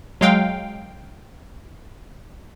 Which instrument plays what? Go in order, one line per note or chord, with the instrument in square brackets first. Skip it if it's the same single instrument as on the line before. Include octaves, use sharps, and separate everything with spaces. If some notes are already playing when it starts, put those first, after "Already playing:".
[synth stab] F#3 G#3 F5 G5